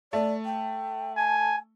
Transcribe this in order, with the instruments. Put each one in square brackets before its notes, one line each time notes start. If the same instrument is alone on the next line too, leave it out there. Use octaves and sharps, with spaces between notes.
[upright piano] A3 [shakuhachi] D5
[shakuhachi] G5
[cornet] G#5 [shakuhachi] A5